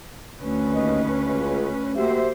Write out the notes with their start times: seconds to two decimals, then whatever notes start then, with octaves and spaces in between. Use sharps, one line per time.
0.40 D2 C#4 B4
0.74 D#2 D#5
1.25 C#2
1.97 A#3 F#4 G4 C5 E5